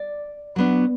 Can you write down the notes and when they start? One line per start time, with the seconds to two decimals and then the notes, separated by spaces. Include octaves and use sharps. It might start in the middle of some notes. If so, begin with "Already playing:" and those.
Already playing: D5
0.56 F#3 B3 D4